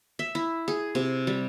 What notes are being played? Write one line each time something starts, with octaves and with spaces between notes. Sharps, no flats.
E5
E4
G#4
C3
G3